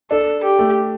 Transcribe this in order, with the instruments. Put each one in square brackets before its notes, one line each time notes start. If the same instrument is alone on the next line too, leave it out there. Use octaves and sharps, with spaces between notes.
[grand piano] D4 [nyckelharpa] A4
[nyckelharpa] G4
[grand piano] A3